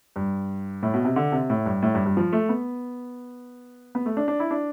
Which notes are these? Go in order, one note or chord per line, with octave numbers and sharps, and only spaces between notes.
G2
A2
B2
C3
D3
C3
A2
G2
A2
G2
G2
F3
A3
B3
B3
A3
D4
D4
E4
D4